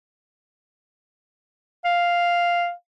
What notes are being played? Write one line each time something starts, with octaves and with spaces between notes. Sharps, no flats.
F5